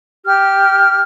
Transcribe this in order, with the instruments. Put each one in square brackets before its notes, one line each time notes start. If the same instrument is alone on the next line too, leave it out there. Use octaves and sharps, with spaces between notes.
[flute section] G4 F6